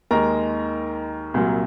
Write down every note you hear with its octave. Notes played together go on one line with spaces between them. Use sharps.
D#2 D#3 G#3 A#4 A#5
C2 A#2 F#3